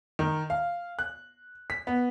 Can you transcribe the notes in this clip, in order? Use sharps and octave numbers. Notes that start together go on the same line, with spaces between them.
D#3
F5
F#6
B6
B3